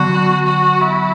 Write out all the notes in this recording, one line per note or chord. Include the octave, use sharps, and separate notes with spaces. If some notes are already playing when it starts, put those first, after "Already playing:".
Already playing: D3 F#3 B3 F#4
F#4
E4